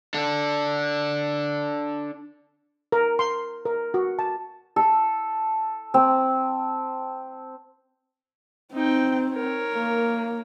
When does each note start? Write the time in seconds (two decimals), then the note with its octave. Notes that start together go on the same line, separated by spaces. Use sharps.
0.14 D4 A4
2.92 A#4
3.19 C6
3.65 A#4
3.94 F#4
4.19 A5
4.76 A4
5.94 C4
8.74 C4 D#4 G5
9.34 A#4 C#5
9.74 A#3